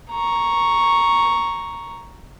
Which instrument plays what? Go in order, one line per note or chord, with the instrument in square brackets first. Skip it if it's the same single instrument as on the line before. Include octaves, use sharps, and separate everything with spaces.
[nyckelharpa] A#5 C#6